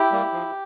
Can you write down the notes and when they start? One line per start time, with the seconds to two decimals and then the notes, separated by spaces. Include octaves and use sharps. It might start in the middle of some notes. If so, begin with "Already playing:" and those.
Already playing: E4 G4
0.12 G3 A#3
0.33 F3